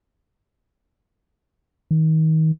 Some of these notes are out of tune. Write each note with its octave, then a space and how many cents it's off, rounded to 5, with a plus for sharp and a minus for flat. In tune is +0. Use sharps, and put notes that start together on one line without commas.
D#3 +30